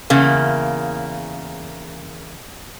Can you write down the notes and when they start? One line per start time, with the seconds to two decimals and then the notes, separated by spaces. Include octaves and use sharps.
0.10 E2 C#3 A#3